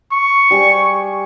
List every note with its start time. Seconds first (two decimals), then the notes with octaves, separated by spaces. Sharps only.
0.12 C#6
0.51 G3 G#4